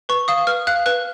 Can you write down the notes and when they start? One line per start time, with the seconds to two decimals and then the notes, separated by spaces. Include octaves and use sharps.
0.09 B4 C#6
0.28 F5 D#6
0.47 B4 F6
0.67 F5 F#6
0.86 B4 F#6